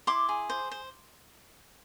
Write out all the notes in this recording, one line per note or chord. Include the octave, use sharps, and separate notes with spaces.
E4 C6 D6
G#4
C5
C5